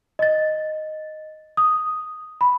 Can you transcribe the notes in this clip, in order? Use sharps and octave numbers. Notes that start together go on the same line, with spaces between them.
D#5 A6
D#6
B5